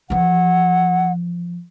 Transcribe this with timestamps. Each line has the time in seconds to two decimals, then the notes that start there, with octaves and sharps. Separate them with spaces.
0.10 E3 F3 F#5